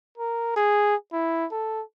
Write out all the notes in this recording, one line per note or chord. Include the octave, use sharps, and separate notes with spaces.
A#4
G#4
E4
A4